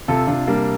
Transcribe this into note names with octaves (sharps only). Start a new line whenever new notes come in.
C3 F4 A4
C3 D4 F4
G3 A#3 D4